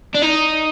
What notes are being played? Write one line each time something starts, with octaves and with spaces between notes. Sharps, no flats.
D4
D#4